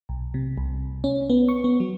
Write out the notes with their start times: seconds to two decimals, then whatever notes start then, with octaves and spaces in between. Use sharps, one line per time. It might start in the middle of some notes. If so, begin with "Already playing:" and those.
0.09 B1
0.34 C3
0.58 C2
1.04 C#4
1.30 B3
1.49 C#6
1.64 B3
1.80 F#3